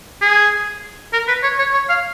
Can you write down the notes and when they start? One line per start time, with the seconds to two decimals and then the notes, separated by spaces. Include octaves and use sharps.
0.21 G#4
1.13 A#4
1.28 B4
1.43 C#5
1.59 C#5
1.73 C#5
1.89 F5